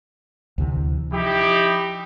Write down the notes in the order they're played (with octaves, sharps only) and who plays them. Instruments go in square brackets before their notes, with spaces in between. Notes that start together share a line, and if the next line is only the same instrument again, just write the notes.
[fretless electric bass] D2 C3 E3
[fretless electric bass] F3 [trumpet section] D#4 E4 G4